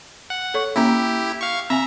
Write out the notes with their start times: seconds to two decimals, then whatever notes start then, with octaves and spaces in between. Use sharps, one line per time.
0.30 F#5
0.54 A4 C#5 C#6
0.76 A#3 C#4 E4 G4 A#5
1.41 F5 C#6
1.70 C4 E5 G#5 A#5